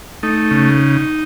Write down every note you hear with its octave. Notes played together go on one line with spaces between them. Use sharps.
A3 D#4
C#3